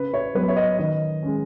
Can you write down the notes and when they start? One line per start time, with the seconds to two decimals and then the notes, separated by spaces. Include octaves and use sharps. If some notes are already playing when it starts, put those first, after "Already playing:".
Already playing: C#3 B4
0.14 C#5
0.35 F#3 B3 B4
0.48 C#5
0.56 D#5
0.79 D#3 D#5
1.22 G#3 C#4